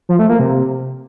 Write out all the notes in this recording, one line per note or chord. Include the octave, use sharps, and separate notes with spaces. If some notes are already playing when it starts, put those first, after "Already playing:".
F3
A3
A#3
C3